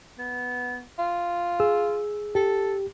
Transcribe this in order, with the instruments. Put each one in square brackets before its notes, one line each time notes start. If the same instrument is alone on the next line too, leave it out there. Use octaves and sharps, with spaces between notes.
[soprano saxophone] B3
F4
[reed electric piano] G#4 E6
[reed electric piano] G4 [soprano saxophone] A4